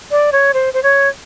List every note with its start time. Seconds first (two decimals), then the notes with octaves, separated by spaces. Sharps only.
0.11 D5
0.32 C#5
0.54 C5
0.74 C5
0.83 C#5